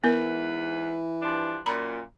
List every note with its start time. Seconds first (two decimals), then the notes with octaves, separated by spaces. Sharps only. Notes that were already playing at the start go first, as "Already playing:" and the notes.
0.04 E2 G#2 E3 B3 A#4 B4
1.22 G2 F3 D4
1.66 F#2 A#2 A#5 B5